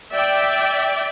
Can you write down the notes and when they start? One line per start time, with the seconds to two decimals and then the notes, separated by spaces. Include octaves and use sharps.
0.13 D5 E5 G5